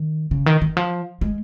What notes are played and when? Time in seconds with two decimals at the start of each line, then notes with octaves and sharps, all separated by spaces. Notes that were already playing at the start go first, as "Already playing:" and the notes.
Already playing: D#3
0.31 C#3
0.46 D#3
0.62 D#3
0.77 F3
1.21 G#3